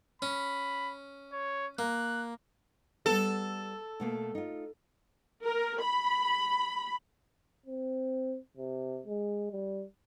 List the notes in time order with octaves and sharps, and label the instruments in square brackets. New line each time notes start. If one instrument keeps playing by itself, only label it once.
[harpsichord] C#4 [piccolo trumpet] B5
[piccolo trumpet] C#5
[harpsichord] A#3 [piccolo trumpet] F#6
[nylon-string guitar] G3 B3 [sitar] A4
[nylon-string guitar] B2 A3 A#3
D#4 F4
[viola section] A#4
B5
[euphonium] C4
C3
G#3
G3